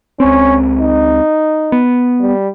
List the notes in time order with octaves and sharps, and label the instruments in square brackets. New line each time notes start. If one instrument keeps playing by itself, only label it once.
[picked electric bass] C#2 C4 [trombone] C#4
[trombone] D#4
[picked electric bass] B3
[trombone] G3